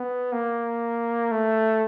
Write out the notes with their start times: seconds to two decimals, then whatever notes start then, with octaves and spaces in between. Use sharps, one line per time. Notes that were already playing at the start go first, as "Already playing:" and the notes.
Already playing: B3
0.32 A#3
1.31 A3